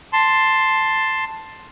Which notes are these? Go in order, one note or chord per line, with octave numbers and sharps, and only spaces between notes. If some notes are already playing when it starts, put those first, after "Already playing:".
A5 C6